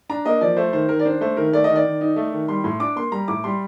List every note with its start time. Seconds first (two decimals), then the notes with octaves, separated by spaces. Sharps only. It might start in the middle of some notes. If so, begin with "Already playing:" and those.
0.10 D4 A#5
0.25 A#3 D#5
0.41 F3 D5
0.57 A3 C5
0.73 D#3 C5
0.89 D#3 A#4
0.99 D5
1.05 D4 C5
1.21 A3 C5
1.37 D#3 A#4
1.53 A3 D5
1.64 D#3 D#5
1.76 D5
1.85 D#3
2.01 D#4
2.16 A3
2.32 D#3
2.48 G3 C6
2.64 A2 C6
2.80 D4 D6
2.96 A#3 C6
3.12 G3 A#5
3.28 A2 D6
3.44 G3 C6